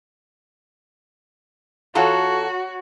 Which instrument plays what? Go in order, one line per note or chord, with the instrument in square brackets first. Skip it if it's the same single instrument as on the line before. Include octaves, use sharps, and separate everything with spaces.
[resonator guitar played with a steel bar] E2 F4 A4 [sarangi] F#4 [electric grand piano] C#5 F#5 A#5